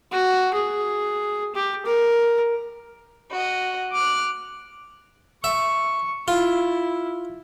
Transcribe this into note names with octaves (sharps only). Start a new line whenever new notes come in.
F#4
G#4
G4
A#4
F#4 D#5
D6 F6 F#6
E5 C#6
E4 F4